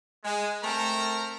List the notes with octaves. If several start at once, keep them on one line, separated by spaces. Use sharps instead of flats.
G#3
A3 C4 A#4 A#5